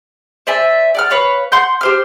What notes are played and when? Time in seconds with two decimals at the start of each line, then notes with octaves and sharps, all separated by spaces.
0.47 C5 D5 E5 G#5
0.95 D5 F#5 F6
1.10 B4 C#5 F5
1.52 F#5 C6 G6
1.81 G4 C5 F6